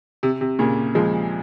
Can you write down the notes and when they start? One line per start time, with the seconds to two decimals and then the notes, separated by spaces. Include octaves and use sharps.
0.23 C3
0.41 C3
0.59 A#2 C#3
0.95 F3 G#3